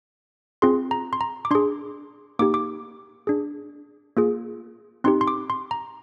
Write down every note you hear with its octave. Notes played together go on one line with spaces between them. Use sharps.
C4 F4 G#4 C6
A#5
C6
A#5
D6
D4 G#4 C6
A#3 D#4 G4 D6
D6
D4 G#4
A#3 F4 G#4
C4 D#4 G4 C6
C6
D6
C6
A#5